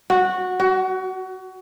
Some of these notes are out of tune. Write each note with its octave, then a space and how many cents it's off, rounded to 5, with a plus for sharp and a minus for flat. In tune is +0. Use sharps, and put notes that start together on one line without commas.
F#4 -10
F#4 +25